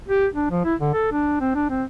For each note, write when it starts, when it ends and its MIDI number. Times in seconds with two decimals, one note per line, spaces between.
0.08 0.26 67
0.35 0.50 62
0.51 0.64 53
0.65 0.74 64
0.80 0.92 50
0.93 1.09 69
1.12 1.37 62
1.41 1.53 60
1.55 1.69 62
1.70 1.84 60